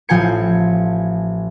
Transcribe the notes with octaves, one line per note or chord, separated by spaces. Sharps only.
A1 F3 G5 G#5 G#6 C#7